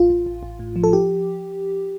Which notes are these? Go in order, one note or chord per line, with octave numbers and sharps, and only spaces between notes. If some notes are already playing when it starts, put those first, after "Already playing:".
Already playing: A1 F4
A1
A1
A1
A2
F3
A4
G4